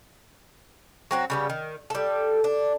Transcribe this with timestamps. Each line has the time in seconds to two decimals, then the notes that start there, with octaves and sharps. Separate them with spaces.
1.11 F#3 C4 F#5
1.30 C#3 G3 B3
1.50 D#3
1.90 G3 A4
2.44 D4